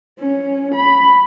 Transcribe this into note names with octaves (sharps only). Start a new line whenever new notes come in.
C#4
B5